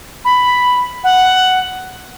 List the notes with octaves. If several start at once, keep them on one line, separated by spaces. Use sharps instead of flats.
B5
F#5